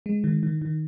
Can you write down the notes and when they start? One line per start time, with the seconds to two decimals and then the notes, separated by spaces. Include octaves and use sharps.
0.06 G#3
0.24 D#3
0.43 D#3
0.62 D#3